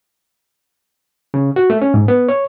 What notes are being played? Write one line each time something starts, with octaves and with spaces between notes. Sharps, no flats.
C#3
F#4
A3
C#4
G#2
B3
C#5